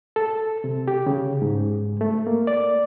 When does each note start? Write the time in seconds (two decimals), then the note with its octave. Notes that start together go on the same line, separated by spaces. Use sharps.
0.16 A4
0.64 C3
0.88 G4
1.07 C#3
1.42 G#2
2.01 A3
2.27 A#3
2.47 D5